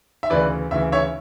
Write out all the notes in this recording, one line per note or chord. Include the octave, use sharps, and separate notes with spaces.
E5
D2 C#3 E3 B4 D5
D2 C#3 E3 E5
C#5 E5